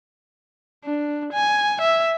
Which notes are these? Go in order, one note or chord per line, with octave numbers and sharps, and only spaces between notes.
D4
G#5
E5